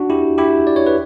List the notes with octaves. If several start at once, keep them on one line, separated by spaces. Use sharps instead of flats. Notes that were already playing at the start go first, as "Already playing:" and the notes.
Already playing: D4 F#4
E4 G4
E4 G4
D5
C#5
B4